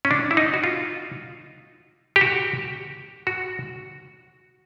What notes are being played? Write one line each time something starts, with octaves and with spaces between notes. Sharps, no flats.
C#4
D4
E4
D#4
F#4
F4
G4
F#4
F#4